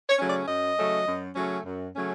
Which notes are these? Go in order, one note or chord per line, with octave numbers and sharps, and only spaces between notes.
C#5
C#3 F#3 A3 C#4
D5
F#2 D#5
C#3 F#3 A3 C#4
F#2
C#3 F#3 A3 C#4
F#2
C#3 F#3 A3 C#4